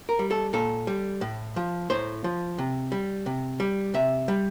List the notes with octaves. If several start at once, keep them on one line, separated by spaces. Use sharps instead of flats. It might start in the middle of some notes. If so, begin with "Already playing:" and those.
A#4
G3
A4
A#2 A4
G3
A2
F3
A2 C5
F3
C3
G3
C3
G3
C3 E5
G3